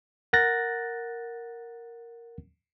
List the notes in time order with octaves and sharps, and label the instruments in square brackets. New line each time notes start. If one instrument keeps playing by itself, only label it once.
[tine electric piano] A#4 F#5 F#6 A6 A#6